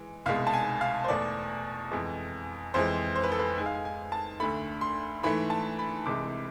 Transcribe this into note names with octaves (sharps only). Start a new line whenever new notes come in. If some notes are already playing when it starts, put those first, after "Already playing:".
Already playing: E3 G#3
C2 B2 G#3 F5
A5
G#5
F5
C5
E2 B2 A3 D5
F2 E3 G#3
F2 E3 G#3 C5
C5
B4
A4
B4
G#2 G#3 G#5
F5
G#5
G#5
A5
D2 D3 A3 B5
C6
G#2 E3 A3 B5
A5
B5
C2 C3 E3 G#3 D6